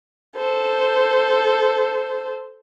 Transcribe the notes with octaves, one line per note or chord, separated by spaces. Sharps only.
A4 C5